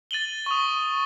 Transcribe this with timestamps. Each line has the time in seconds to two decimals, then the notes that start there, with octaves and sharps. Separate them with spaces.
0.11 A6 D#7 F#7 G7
0.46 C#6 D#6